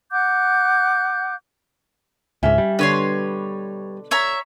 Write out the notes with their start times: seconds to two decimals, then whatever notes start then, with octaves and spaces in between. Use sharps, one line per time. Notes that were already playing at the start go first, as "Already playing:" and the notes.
0.12 F#5 D6 F#6 G6
2.43 C#2 G#2 C#4 E5
2.58 G3
2.79 B2 D3 D4 B4 C#5 C6
4.11 C#5 E5 A#5